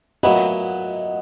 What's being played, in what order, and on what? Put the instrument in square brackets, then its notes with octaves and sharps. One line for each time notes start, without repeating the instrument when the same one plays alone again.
[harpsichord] A#2 F#3 B3 E4 [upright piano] D#5 F#5